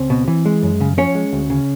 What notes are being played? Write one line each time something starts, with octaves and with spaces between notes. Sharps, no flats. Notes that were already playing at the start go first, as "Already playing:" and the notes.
Already playing: C#2 C4 C5
B2
E3
G#3
F#2
C#3
F3 C#4 C#5
G#3
D2
C#3